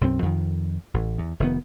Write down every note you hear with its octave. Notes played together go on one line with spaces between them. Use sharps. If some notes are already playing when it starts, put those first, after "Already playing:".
B1 F#2 G3 C4
F2 D#3
A1
E2
F1 D#3 B3